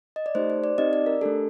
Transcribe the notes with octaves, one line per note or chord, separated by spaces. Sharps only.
D#5
D5
A3 D#4 G4 C5
C5
D5
C4 D#4 G4 D#5
D5
A#4
A3 D4 G4 A4